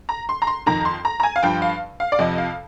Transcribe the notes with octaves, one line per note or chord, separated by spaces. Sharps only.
A#5
C6
A#5
C6
F2 D#3 A#5
C6
A#5
A#5
G#5
F5
G2 F3 G5
F5
F5
D5
F2 C3 F3 D#5
F5